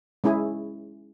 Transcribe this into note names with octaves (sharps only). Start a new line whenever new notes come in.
G#3 C#4 E4 G#4 G#5